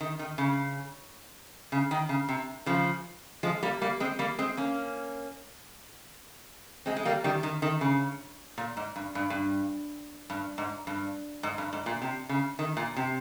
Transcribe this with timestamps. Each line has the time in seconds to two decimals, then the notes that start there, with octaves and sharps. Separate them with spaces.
0.01 D#3
0.19 D#3
0.38 C#3
1.72 C#3
1.91 D#3
2.09 C#3
2.29 C3
2.66 C#3 F3
3.43 F3 G#3
3.63 G3 A#3
3.81 G3 A#3
4.00 G#3 C4
4.19 G3 A#3
4.39 G#3 C4
4.57 A#3 C#4
6.86 G#3 C4
6.96 G#3
7.05 G3 A#3
7.24 D#3 G3
7.43 D#3
7.62 D#3
7.81 C#3
8.58 A#2
8.77 G#2
8.96 G2
9.15 G2
9.30 G2
10.30 G2
10.58 G#2
10.87 G2
11.43 G#2
11.58 G2
11.73 G#2
11.86 A#2
12.02 C3
12.29 C#3
12.59 D#3
12.77 A#2
12.96 C3